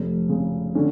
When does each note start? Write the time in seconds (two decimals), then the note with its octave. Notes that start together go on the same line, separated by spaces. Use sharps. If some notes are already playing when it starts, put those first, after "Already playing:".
Already playing: F1
0.29 C#3
0.75 D3 C#4